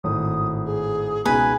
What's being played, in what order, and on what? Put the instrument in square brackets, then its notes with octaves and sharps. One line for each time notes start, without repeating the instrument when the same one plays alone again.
[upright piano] G#1 [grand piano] A2 [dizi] D#6
[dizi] G#4
[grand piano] C#2 B2 B3 [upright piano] G#3 [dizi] D#4 [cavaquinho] B4 G#5